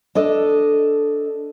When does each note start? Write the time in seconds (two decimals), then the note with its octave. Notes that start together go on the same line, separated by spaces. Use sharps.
0.15 D4 A4 D#5